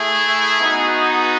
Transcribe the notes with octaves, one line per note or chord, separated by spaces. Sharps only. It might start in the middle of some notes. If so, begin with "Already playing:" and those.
Already playing: A3 E4 G#4
B3 D#4 F#4